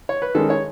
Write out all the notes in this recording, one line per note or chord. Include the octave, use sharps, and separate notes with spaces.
C#5
B4
D#3 G#3 C#4 A4
C#5